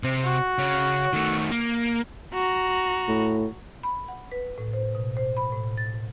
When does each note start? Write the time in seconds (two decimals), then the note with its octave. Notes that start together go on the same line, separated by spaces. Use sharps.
0.03 C3 C4
0.25 F#4
0.58 C#3
1.13 D#3 A3
1.51 A#3
2.34 F#4 A#5
3.08 A2
3.83 B5
4.08 F#5
4.32 B4
4.58 A2
4.73 C5
4.95 B2
5.17 C5
5.37 B5
5.52 A2
5.77 A6